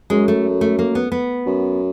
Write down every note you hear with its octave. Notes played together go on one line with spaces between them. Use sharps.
F#2 G#3
A3
A3
A#3
B3
B3
F#2